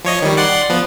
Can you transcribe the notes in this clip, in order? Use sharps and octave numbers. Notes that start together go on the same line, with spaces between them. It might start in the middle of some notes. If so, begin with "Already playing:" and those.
F3 C#5 D#5
D#3 G3
D5 F#5 C6
F3 B3